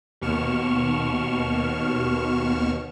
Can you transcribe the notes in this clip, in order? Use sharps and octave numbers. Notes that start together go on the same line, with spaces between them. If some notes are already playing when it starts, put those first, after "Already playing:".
D#2 B2 C#6 F6 E7